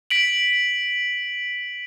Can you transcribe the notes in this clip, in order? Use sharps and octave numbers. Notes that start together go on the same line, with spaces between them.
B6 D7 F#7